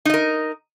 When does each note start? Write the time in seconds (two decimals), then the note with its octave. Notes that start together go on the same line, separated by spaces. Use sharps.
0.05 D#4
0.10 D#5
0.14 A#4